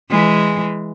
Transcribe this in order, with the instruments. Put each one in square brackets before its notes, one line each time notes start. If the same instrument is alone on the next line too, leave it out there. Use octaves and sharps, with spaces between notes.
[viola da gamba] E3 G#3